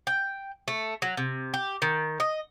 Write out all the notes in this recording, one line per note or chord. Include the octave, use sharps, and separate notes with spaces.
G5
A3
F#3
C3
G4
D#3
D#5